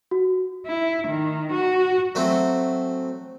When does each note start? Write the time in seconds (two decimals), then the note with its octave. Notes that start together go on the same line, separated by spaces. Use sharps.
0.11 F#4
0.66 E4
1.08 D#3
1.52 F#4
2.15 F#3 A3 C4